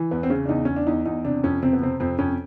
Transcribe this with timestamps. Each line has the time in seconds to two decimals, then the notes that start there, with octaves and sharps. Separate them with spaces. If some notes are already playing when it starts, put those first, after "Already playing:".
Already playing: E3
0.11 E2 B3
0.23 C4
0.30 C#3 C#4
0.45 D4
0.49 E2 D#4
0.65 E2 C#4
0.76 D4
0.87 E2 D#4
1.05 E2 D#4
1.25 C3 D4
1.43 F2 C#4
1.63 C3 C4
1.73 B3
1.81 C3 C4
2.00 F2 C4
2.19 F2 C#4